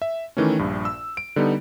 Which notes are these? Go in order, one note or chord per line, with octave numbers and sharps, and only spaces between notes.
E5
D#3 E3 A3 C#4
A#1 G2
E6
D7
D3 G3 B3 D#4